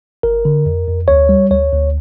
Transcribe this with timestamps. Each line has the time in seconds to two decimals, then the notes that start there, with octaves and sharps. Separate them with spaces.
0.23 G1 A#4
0.45 D3
0.66 F2
0.88 F2
1.08 D2 C#5
1.29 G3
1.51 D2 C#5
1.72 D2